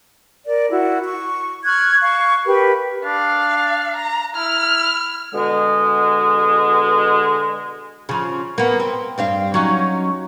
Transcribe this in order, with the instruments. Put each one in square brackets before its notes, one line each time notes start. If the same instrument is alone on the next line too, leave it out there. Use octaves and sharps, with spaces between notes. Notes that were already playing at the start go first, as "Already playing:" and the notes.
[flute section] A#4 D5
E4 F#4
C#6
C#6 F6 F#6 G#6
F5 C#6
G4 A#4 B4 B5
[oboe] D4 [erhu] F5
[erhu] A#5
[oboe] E4 [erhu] F6
[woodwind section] B2 D3 G#3
[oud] C#3 F3
A#3 B3
C4
G2 C4 F5
F#3 C#4 D#4